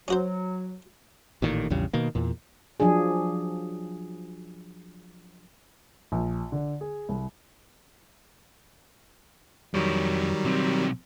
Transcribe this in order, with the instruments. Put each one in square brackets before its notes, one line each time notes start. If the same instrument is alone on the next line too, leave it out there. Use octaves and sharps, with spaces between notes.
[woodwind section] F#3 [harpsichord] C#4 F#4 C5
[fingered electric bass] A1 A#2 D#3
A#1 E2 C#3 G3
B2 D#3 A#3
E2 A#2
[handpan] F3 F#3 D4 G#4
[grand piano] A#1
D3
G#4
C2
[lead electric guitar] F2 C#5 [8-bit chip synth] D#3 F#3 G3
[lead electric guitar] B1 C4